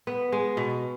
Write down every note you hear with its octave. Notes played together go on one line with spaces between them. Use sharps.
B3
G#3
B2